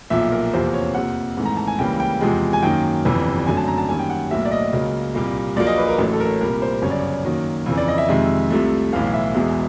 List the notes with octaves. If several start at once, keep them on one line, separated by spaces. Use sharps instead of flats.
B1 A#2 F3 E5
A#4
F1 E2 C3 F3 A#3 C5
C#5
F2 C3 F3 A#3 F#5
G#1 G#2 E3 A3
A#5
A5
G#5
C#2 C#3 E3 G3 A#3 G5
G5
E2 C3 F3 G#3
G#5
F#2 D#3 F#3 A#3 G5
G1 F2 C3 E3 G3
G#1 F#2 D3 F#3 A3 G#5
A5
A#5
A5
F#2 D#3 G3 A#3 G#5
G5
F#5
B1 A2 F#3 A#3 E5
D5
D#5
C#2 C#3 F#3 A#3
C2 A#2 G3 A#3
A#1 A#2 F#3 A#3 D5
D#5
B4
A#4
A1 A2 F#3 A3
A4
A#4
C2 A#2 G3 A#4
C5
G1 F#2 C#3 F#3 C#5
D5
C#5
F#2 D#3 F#3 A#3
F2 C#3 E3
D5
D#5
E5
F2 C3 D#3 G#3
C2 C3 F3 A3
B1 A2 E3 F5
E5
E1 E2 B2 G#3